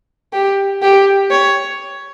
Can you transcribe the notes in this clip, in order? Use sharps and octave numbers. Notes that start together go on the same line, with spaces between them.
G4
G4
C#5